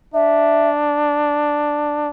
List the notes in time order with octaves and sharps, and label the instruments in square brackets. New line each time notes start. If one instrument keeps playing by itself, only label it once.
[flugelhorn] D4 [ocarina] E5